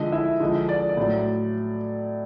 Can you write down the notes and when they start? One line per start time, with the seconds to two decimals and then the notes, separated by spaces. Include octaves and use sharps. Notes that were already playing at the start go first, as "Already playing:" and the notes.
Already playing: D3 F3 G#3 D#5
0.12 E4 E5
0.40 D3 F3 G#3 D#5
0.69 D5
0.89 D5
0.97 A2 F#3